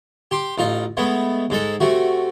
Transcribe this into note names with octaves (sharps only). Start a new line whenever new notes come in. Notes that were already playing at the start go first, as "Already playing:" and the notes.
G4 C6 D6
A1 D#4 F4
G#3 A3 B3
G#2 G#3 A4
C3 A3 F#4